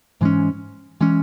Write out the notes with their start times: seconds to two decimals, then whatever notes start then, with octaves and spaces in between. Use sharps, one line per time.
0.21 G#2 E3 G#3 C#4
1.01 E3 G#3 C#4